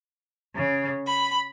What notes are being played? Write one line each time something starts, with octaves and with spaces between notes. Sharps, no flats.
C#3
B5